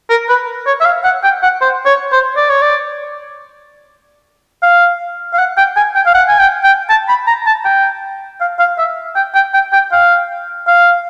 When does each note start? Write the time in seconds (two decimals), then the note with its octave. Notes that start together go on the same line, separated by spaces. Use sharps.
0.10 A#4
0.29 B4
0.67 C#5
0.81 E5
0.85 F5
1.04 F#5
1.23 G5
1.43 F#5
1.61 C5
1.86 C#5
2.12 C5
2.36 D5
2.49 C#5
2.62 D5
4.63 F5
5.33 F5
5.39 F#5
5.57 G5
5.76 G#5
5.95 G5
6.06 F5
6.14 F#5
6.28 G#5
6.39 G5
6.64 G5
6.90 A5
7.09 B5
7.27 A#5
7.46 A5
7.65 G5
8.41 F5
8.59 F5
8.78 E5
9.15 G5
9.35 G5
9.54 G5
9.73 G5
9.92 F5
10.67 F5